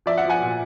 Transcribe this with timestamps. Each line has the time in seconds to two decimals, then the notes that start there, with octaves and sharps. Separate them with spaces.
0.06 F3 D5 E5
0.17 E5 F#5
0.24 F3
0.30 F#5 G#5
0.42 A#2